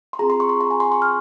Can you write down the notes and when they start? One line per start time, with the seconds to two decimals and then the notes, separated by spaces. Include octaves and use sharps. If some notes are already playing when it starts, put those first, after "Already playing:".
0.13 C6
0.19 C4 F4 G#4 A#5
0.30 C6
0.40 C#6
0.49 C6
0.61 A#5
0.71 G#5
0.80 C6
0.92 C#6
1.02 F6